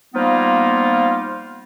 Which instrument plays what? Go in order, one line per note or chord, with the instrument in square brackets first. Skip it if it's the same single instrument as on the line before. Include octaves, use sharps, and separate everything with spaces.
[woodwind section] F3 G3 A#3 B3 D#4 F4